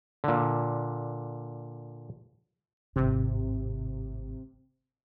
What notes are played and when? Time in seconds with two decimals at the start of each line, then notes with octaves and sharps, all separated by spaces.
0.24 A#2 D3
2.96 G#1 A2 C3